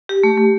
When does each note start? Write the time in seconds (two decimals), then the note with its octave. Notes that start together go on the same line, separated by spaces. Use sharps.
0.09 G4
0.23 A3
0.38 A3